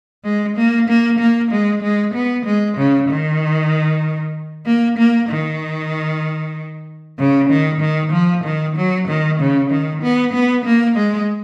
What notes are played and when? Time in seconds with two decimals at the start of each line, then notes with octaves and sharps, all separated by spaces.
0.24 G#3
0.57 A#3
0.88 A#3
1.19 A#3
1.51 G#3
1.82 G#3
2.14 B3
2.46 G#3
2.77 C#3
3.09 D#3
4.66 A#3
4.98 A#3
5.29 D#3
7.19 C#3
7.50 D#3
7.81 D#3
8.12 F3
8.44 D#3
8.76 F#3
9.08 D#3
9.40 C#3
9.71 D#3
10.02 B3
10.33 B3
10.65 A#3
10.96 G#3